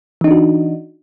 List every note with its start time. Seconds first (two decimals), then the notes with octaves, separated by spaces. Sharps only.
0.21 E3
0.24 D#4
0.28 D4
0.31 F#4